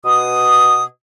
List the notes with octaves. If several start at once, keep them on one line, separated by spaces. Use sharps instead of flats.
B2 D#6